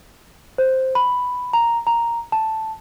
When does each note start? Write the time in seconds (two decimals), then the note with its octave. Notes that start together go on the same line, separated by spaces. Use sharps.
0.58 C5
0.95 B5
1.53 A#5
1.87 A#5
2.32 A5